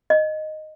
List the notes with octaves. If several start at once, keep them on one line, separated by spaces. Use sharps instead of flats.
D#5